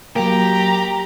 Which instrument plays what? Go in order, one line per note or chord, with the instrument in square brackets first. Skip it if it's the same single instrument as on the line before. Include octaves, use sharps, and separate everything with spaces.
[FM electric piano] F#3 A#3 [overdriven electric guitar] G4 [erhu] A#5